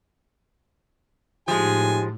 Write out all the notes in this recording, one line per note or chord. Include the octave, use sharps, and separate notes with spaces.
A2 F3 G#3 D#4 G4 G#5